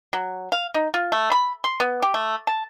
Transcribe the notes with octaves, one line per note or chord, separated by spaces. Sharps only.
F#3
F5
D#4
F4
A3
B5
C6
B3
G4
A3
A5